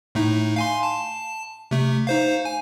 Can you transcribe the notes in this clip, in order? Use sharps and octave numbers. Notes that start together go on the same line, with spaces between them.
A2 A3 D#4
F5 G#5 C6
A5
C3 A3
D#4 C5 F5
G#5